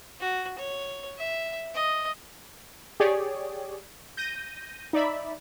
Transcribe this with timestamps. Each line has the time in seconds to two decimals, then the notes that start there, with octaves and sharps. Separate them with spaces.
0.20 F#4
0.58 C#5
1.18 E5
1.74 D#5
3.00 G4 G#4 C#5 D5
4.17 G6 A#6 D#7
4.93 D#4 D5 E5 B5